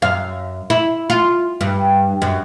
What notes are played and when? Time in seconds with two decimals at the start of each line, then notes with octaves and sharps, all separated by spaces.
0.02 F#2 F5
0.70 E4
1.10 F4
1.61 G2
2.22 F#2